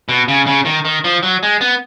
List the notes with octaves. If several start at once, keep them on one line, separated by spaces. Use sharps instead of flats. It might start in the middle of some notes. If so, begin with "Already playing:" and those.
B2
C#3
C#3
D#3
D#3
F3
F#3
G#3
B3